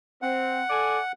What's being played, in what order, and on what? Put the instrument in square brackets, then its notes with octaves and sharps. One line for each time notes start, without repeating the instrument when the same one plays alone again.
[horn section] C4 [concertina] F#5
[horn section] A4 D5 G#5